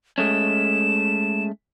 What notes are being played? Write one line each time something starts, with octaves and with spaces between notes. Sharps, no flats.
G#3 A3 C#4 E7